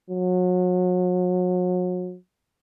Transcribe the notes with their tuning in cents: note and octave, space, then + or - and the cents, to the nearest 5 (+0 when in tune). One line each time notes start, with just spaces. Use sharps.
F#3 -35